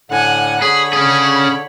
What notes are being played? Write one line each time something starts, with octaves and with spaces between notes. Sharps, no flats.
A2 D3 F#5 G#5
D3 G#4 C#5 B5
C#4 G#4